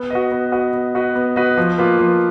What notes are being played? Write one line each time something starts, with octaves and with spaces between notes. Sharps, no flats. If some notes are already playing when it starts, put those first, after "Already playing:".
Already playing: B3
F#4 B4 D#5
B3
F#4 B4 D#5
B3
F#4 B4 D#5
B3
F#4 B4 D#5
F3
A#3 F4 B4
F3